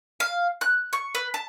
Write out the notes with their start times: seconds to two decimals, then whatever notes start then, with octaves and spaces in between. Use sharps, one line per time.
0.20 F5
0.61 F#6
0.93 C#6
1.15 B4
1.34 A5